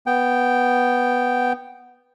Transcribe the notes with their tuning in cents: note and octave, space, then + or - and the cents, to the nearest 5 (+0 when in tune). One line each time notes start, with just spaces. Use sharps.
B3 +0 G5 -5